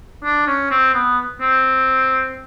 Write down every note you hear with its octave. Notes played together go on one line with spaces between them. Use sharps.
D4
C#4
C4
B3
C4